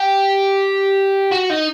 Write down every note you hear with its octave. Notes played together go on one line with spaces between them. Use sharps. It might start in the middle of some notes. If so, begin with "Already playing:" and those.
Already playing: G4
F#4
D#4